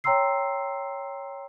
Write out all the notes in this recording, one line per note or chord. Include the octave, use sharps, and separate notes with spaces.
C#5 G5 A#5 C6 E6 C7